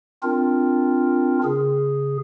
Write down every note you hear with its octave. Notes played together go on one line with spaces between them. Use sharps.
C4 D4 F4 A#4
C#3 G#4